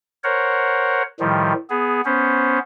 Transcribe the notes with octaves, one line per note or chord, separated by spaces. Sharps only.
A#4 C5 C#5 F#5
A2 D#3 F3 G3
B3 G#4
B3 C#4 C5